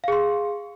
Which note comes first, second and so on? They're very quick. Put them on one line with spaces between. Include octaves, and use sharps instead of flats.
F5 G#4 C6